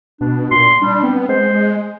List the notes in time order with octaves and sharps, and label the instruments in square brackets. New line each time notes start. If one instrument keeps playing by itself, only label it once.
[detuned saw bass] B2 [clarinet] D4
[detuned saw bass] A#2 [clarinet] C6
[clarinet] G3 [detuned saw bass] D4
[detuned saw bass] B3 [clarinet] C4
[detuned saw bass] G#3 [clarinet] C5